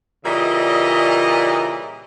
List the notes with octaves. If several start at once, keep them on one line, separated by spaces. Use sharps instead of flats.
A#2 C#3 E3 G3 D#5